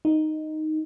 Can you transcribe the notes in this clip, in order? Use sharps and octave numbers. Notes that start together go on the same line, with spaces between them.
D#4